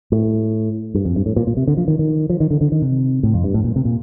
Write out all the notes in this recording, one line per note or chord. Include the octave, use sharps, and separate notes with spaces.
A2
G2
F2
G2
A2
A#2
A#2
C3
D3
F3
D#3
D#3
F3
D#3
D3
D3
D#3
C3
A2
F2
G2
A2
A#2
C3
A#2